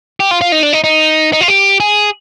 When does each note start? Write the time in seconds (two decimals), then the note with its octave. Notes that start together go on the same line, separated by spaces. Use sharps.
0.20 G4
0.31 F4
0.41 F4
0.52 D#4
0.63 D4
0.73 D#4
0.84 D#4
1.33 D#4
1.41 F4
1.48 G4
1.80 G#4